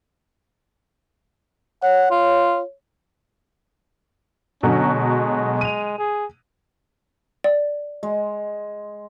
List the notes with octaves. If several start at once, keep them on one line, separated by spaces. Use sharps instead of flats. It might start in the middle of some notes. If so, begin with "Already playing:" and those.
C#5 F#5
F4
B2 D3 F#3 C#4
G#3
D#7 F7
G#4
D5
G#3